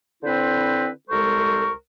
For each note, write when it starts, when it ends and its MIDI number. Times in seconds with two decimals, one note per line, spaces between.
0.24 0.89 50
0.24 0.89 60
0.24 0.89 64
0.24 0.89 71
0.24 0.89 72
1.10 1.71 36
1.10 1.71 56
1.10 1.71 69
1.10 1.71 70
1.10 1.71 72
1.10 1.71 85